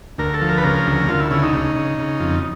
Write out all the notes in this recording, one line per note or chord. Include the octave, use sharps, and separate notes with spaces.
D2 A#4
A4
F3
A#4
B4
C#3 A#4
D2
D2 F4
E4
C#3 E4
D#4
C#3
C#3
C#3
F2